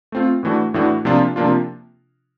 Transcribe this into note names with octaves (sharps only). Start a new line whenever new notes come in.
A3 C4 F4
A2 E3 A3 D4 F#4
A2 E3 A3 D4 F#4
C3 F3 A#3 D4 F4
C3 F3 A#3 D4 F4